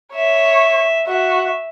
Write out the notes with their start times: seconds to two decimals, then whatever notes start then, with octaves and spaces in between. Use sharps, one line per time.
0.14 C#5 E5
1.07 F#4 E5